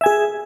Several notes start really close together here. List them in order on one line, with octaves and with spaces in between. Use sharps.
E5 G#5 G#4